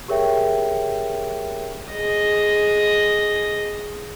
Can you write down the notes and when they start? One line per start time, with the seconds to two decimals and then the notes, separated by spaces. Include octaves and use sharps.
0.08 G4 G#4 A#4 C#5 E5 G5
1.92 G#4 D#5